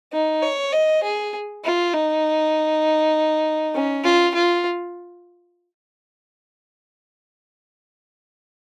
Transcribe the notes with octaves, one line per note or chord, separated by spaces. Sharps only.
D#4
C#5
D#5
G#4
F4
D#4
C#4
F4
F4